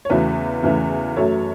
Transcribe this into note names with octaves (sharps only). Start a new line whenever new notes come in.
C#5
E2 C#3 E3 A3 F#4 B4
E2 C#3 E3 A3
F#2 F#3 A3 A4 C#5